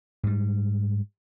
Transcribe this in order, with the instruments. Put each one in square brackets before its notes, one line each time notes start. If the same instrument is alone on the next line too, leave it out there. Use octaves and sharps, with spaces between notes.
[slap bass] G#2 G3